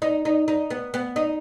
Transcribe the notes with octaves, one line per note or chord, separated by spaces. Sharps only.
D#4
D#4
D#4
B3
B3
D#4